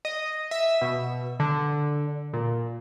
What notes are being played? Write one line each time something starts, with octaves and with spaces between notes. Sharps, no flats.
D#5
E5
B2
D3
A#2